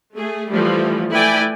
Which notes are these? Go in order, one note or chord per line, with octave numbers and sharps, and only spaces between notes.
A3 G#4
E3 F3 G3 A3
A3 E4 B4 D5 G5 G#5